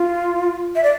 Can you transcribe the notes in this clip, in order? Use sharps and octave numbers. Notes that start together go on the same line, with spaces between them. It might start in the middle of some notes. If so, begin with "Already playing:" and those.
Already playing: F4
E5
D5